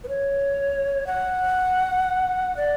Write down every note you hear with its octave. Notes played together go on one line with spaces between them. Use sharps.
B4
C#5
F#5
D5